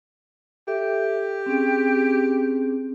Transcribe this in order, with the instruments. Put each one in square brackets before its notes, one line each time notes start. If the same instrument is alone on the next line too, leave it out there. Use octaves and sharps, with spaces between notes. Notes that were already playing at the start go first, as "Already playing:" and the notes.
[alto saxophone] G4 [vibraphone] A4 E5
[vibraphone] C4 C#4 G#4